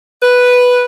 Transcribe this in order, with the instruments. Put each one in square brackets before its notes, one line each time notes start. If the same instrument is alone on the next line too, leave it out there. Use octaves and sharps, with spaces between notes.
[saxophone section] B4